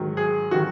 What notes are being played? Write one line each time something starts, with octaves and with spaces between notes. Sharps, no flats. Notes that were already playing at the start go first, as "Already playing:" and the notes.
Already playing: G#2 D#3 F#3
G#4
D#3 F#3 F#4